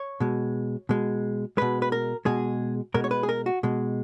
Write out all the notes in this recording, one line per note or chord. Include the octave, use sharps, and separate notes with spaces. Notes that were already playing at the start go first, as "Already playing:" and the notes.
Already playing: C#5
B2 G#3
B2 G#3
B2 G#3 B4
B4
A#4
B2 G#3 G#4
B2 G#3 A#4
C#5
B4
G#4
A#4
F#4
B2 G#3